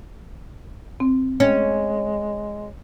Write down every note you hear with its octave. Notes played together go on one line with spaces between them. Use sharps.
C4
G#3 C#4